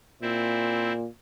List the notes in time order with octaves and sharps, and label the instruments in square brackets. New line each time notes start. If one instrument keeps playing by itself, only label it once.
[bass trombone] A#2 [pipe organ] C4 E4